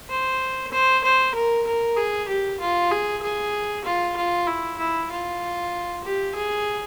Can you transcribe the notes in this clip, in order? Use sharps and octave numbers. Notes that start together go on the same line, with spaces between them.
C5
C5
C5
A#4
A#4
G#4
G4
F4
G#4
G#4
F4
F4
E4
E4
F4
G4
G#4